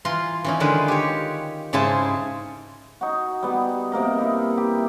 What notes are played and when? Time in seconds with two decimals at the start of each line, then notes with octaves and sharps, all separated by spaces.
0.05 E3 F4 A#5 C6
0.44 E3 C#4 D#4
0.60 D3 D#3 G#3 F4 B4
0.88 G4 C#5
1.73 G#2 C#3 E4 G#4 C5 A5
3.01 D#4 F#4
3.43 G3 B3
3.92 C3 A#3 A#4 D#5
4.18 D#4 E4
4.57 G4